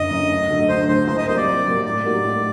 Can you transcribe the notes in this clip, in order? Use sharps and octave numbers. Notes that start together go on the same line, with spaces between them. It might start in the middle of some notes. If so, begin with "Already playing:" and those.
Already playing: F#1 F#2 D3 D#5
F#2 D3
D2
D3 F#3 A3
D2 C5
D3 F#3 A3 C5
C2 C5
D#5
C3 F#3 A#3 C5
D5
C2
C3 F#3 A#3
A2 D5
G3 A#3 D#4 F#4
A2